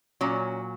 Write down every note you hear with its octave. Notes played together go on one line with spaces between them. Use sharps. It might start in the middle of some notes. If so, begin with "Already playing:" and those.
A#2 F#3 C#4